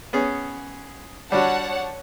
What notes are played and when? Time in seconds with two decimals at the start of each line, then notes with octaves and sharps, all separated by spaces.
0.13 B3 C#4 G#4
1.32 G3 D4 F#4 C#5 F#5 A5